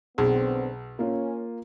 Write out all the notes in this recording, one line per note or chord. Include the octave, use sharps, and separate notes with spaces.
B1 D3 B3 C4 G#4
A#3 C#4 F4